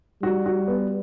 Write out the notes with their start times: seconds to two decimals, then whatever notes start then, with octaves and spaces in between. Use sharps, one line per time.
0.22 G3 F#4
0.46 F#4
0.68 B3